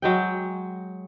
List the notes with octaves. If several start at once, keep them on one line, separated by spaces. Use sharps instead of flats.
F#3 G#3 G5